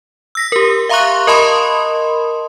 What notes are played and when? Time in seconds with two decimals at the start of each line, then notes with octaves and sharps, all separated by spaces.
0.35 E6 A#6 B6
0.52 G4 A#4
0.89 E5 F5 A#5 C6 C#6 F#6
1.27 A#4 D#5 A5 B5 C6 D#6